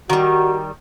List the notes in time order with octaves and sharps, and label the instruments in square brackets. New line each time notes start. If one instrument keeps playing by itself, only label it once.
[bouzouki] D#3 G3 [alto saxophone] F#4